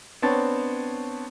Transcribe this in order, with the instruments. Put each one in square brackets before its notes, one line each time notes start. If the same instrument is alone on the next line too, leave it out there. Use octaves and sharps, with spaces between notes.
[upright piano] B3 C4 D4 C#5 A5 A6